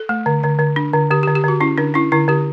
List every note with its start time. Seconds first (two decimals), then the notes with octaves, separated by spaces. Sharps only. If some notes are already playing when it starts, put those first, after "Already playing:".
Already playing: A4
0.09 A3
0.26 D3
0.43 D3
0.59 D3
0.76 D4
0.93 D3
1.11 D3 G4
1.23 G4
1.28 D3
1.35 G4
1.44 D3 F#4
1.60 C#4 E4
1.78 D3 D4
1.94 C#4 E4
2.12 D3 E4
2.28 D3 G4